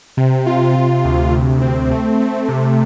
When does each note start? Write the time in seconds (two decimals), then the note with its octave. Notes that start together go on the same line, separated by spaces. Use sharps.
0.17 C3
0.47 F4
0.76 C3
1.05 D2
1.33 D2
1.62 C4
1.91 A3
2.20 A3
2.49 C3